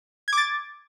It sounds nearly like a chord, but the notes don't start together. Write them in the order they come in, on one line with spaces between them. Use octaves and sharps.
G#6 D6 A6